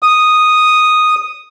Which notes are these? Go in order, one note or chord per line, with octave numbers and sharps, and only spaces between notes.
D#6